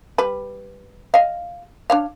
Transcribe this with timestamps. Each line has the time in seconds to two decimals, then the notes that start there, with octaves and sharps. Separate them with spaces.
0.18 G3 B4
1.14 D#5 F5
1.90 D4 C#5 F5